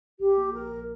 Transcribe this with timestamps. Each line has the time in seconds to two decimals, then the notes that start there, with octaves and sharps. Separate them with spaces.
0.20 A#1 G4
0.37 A#3
0.53 A#1 A#4
0.70 A#1